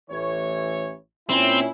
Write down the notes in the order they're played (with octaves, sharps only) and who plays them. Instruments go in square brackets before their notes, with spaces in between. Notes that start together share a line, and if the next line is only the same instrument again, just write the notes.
[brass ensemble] A1 E3 C#5
[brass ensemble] A#2 C#4 E4 [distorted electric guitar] C4